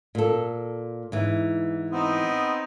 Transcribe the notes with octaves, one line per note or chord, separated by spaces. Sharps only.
A#2 A4
G#2 E3
B3 C4 D#4